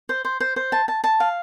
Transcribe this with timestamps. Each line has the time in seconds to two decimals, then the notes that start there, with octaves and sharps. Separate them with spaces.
0.09 C5
0.25 C5
0.40 C5
0.56 C5
0.72 A5
0.88 A5
1.04 A5
1.20 F5